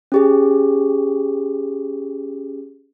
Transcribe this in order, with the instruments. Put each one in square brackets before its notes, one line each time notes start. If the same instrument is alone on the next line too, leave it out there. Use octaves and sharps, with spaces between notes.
[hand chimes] C#4 G4 G#4